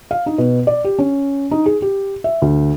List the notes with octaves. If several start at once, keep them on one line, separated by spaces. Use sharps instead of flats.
F5
D#4
B2
D5
G4
C#4
D#4
G#4
G4
E5
D2